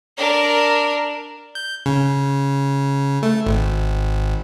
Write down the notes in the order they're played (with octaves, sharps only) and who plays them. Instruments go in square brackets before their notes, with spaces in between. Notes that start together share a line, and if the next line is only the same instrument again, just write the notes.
[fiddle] D4 A#4
[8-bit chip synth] G6
C#3
A3
G#1